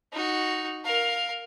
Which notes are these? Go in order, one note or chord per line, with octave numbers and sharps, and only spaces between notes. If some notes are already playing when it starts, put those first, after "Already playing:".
D#4 F#4
A#4 F5